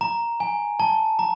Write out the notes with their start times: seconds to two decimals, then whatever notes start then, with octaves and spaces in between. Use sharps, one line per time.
0.01 A#5
0.40 G#5
0.80 A5
1.19 A#5